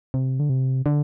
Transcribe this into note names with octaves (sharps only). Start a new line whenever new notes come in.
C3
D3
C3
D3